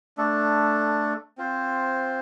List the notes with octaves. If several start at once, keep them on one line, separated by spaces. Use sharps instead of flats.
A3 D4 A4
C4 F4 C5